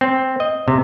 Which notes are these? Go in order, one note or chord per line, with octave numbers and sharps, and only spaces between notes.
C4
D#5
C3